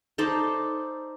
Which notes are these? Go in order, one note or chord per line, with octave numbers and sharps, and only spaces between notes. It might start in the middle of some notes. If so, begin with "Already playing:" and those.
D#4 A4 C5 D5